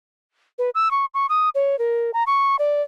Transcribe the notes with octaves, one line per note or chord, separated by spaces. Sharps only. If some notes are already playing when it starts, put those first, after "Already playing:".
B4
E6
C#6
C#6
D#6
C#5
A#4
A#5
C#6
D5